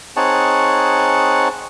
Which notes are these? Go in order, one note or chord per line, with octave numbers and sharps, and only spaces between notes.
C4 D#4 G#4 C#5 F#5 A5